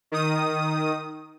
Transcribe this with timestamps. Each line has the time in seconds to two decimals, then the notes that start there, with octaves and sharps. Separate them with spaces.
0.12 D#3 D#6